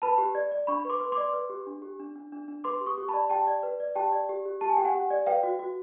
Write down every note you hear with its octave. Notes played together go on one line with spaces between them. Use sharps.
B4 A5 B5
G4
D5
D5
D4 B5 C#6
B4 C6 D6
B4
C6 D6
D5
B4
G4
D4
G4
D4
D4
D4
D4
B4 C6 D6
G4
C#6 D#6
G4
A5 B5
D5
G4 G5 A5
D5
B4
D5
G4 G5 A5
D5
G4
G4
G4 A5
G#5
G4 G5
F#5 G#5
G4
D5
B4 F5 G5
F#4
F#4